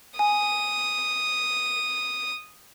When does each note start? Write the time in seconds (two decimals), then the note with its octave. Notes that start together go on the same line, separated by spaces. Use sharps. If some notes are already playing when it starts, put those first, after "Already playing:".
0.19 G#5 D#6